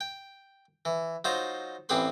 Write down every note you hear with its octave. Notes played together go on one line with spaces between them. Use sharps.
G5
E3
F#3 D#4 F4 C5
A1 C4 G4 G#4 B4 C6